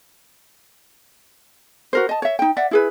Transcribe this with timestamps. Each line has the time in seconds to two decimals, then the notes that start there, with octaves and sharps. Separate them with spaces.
1.93 F#4 A#4 C5
2.09 D#5 A5
2.22 C#5 E5
2.39 D#4 G5
2.57 D5 E5 F#5
2.71 E4 G#4 B4